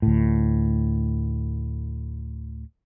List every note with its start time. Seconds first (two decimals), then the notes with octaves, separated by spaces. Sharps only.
0.02 D2 A2